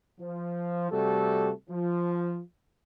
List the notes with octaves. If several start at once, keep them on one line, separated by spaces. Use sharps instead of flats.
F3
C3 G3 A3 F#4 G4 A4
F3